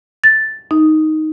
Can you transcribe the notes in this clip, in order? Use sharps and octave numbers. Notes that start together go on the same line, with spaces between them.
A6
D#4